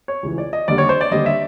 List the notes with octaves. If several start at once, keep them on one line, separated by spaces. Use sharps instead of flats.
C#5
C#2 C#3 E3
D5
D#5
D#2 D3 G3 D5
C#5
C5
D5
D#2 D3 G3 D#5
E5